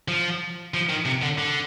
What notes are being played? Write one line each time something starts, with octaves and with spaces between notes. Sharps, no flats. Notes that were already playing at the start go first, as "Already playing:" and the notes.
F3
F3
D#3
C3
D3
D3